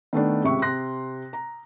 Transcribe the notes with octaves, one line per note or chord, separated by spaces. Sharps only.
D#3 A3 B3 D4
C#2 C3 E5 C#6
C3 C6 F#6 A#6
A#5